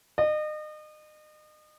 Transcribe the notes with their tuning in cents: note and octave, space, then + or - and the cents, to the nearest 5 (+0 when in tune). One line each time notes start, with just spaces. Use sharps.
D#5 -35